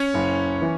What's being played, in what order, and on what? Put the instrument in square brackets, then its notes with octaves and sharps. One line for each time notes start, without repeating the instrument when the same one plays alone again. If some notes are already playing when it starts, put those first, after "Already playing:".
Already playing: [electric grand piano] C#4 C#5
[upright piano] F#1
E3